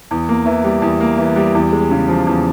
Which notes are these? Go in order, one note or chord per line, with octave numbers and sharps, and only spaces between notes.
E2
A#3
E3
G3
E2
A#3
E3
G3
E2
G#3
C#3
F3
E2